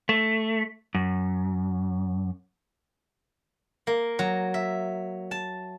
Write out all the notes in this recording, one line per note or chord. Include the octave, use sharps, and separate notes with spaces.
A3
F#2
A#3
F#3
E5
A5